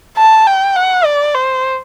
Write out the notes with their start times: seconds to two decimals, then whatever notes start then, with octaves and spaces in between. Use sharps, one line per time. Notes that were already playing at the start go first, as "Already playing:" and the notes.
0.17 A5
0.47 G5
0.76 F#5
1.05 D5
1.35 C5